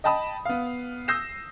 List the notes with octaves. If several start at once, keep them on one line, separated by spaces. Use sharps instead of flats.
D#5 G5 A5 B5 D#6
B3 F5
D#6 E6 G6 A#6 C7 E7